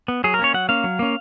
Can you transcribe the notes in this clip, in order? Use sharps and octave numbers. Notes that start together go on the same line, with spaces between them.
B3
F#3 G#4
A#4
A#3 C#4 C#5
F#3 F#5
A#3 C#4 F5
F#3
A#3 C#4